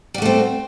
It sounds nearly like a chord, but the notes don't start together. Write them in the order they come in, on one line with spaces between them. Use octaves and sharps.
G3 F#4 A3 C4